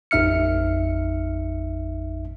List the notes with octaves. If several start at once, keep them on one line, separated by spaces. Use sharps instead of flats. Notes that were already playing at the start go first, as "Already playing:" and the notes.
A1 F2 D#4 E5 F6 C#7